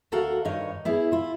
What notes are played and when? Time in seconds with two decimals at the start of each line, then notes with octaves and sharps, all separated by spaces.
0.12 D2 F#4 A4 A#4 F5 F#5
0.45 G2 D#3 D#4 C#5
0.85 B3 E4 G#4
1.12 E4 F4